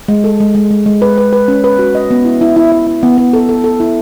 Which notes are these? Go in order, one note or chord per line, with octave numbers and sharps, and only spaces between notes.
G#3
A4
G#3
G#3
G#3
G#3
B4
B4
B4
C#4
B4
F#4
D#5
B3
E4
E4
E4
E4
E4
B3
B3
A4
A4
A4
E4